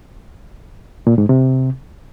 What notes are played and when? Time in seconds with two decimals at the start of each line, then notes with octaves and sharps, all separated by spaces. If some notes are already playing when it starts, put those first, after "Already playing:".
1.07 A#2
1.18 G#2
1.29 C3